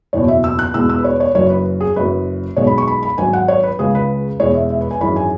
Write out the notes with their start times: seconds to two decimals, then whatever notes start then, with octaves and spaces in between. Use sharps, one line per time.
0.13 F#1 E2 B2 C#5
0.28 E5
0.44 E6
0.59 F#6
0.74 E2 B2 G#3 E6
0.89 E6
0.98 B4
1.04 C#5
1.20 C#5
1.35 F#1 F#2 F#3 C#5
1.50 B4
1.81 G#4
1.96 F#1 F#2 F#3 B4
2.57 B1 B2 G#3 C#5
2.67 B5
2.78 C#6
2.87 B5
3.03 B5
3.18 G#1 G#2 F#3 G#5
3.33 F#5
3.48 C#5
3.64 B4
3.79 C#2 C#3 G#3 G#4
3.95 B4
4.40 E1 E2 E3 G#3 C#5
4.55 E5
4.70 E5
4.81 B4
4.91 G#5
5.01 G#1 F#2 E3 G#3 B5
5.16 G#5